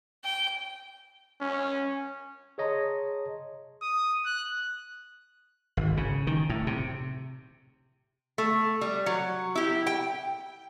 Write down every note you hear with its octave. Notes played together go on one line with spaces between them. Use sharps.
G5
C#4
G#4 C#5 D#5 A5 A#5 C6
D#6
F#6
G#1
C#3
D#3
A2
C3
A3
G3
F#3
E4 G4
G5